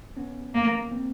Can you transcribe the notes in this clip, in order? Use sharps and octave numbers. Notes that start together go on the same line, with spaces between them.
B3 C#4
A#3
A#3 C4